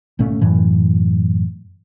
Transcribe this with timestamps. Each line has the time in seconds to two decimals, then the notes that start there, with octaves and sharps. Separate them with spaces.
0.19 G1 A#2 A3 C#4
0.41 F#2 A2 E3